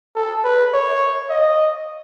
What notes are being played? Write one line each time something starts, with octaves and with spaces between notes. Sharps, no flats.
A4
B4
C#5
D#5